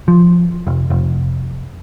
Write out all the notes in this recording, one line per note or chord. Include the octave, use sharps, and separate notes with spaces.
F3
F1
F1